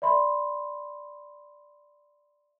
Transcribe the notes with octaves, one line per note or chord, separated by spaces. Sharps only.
D5 E5 B5 C6